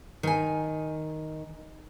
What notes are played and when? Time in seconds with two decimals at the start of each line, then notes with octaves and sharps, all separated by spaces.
0.23 D#3 G#5